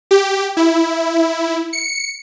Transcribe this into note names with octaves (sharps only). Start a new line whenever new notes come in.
G4
E4
C#7